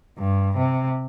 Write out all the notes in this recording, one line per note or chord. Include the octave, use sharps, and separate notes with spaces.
G2
C3